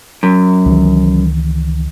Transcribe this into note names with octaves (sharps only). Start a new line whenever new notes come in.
F#2
C#2 D#3 E3